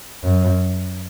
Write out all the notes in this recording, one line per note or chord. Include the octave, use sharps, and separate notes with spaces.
F#2